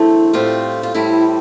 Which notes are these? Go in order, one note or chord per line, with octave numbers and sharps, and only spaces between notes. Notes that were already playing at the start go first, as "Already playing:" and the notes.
Already playing: E2 D3 A3 C4
A2 G3 C4 F4
F4
A2 G3 C4 E4